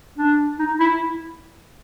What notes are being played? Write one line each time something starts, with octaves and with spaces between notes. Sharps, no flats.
D4
D#4
E4